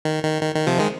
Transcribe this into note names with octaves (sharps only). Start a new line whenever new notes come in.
D#3
D#3
D#3
D#3
C3 F3
D#3 G#3